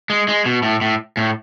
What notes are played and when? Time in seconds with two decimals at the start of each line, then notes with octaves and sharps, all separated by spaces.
0.10 G#3
0.28 G#3
0.45 B2
0.63 A2
0.81 A2
1.17 A2